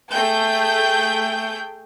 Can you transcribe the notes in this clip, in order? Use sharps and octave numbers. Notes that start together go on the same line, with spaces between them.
A3 G#4 G5 G6